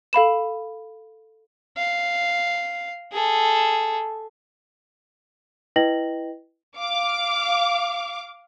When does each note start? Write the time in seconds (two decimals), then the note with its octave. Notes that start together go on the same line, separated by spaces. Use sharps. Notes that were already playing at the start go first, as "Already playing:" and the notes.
0.13 A4 F5 B5 E7
1.77 F5
3.13 G#4 A4
5.76 E4 B4 D#5 G5 A#6 F#7
6.78 F5 D6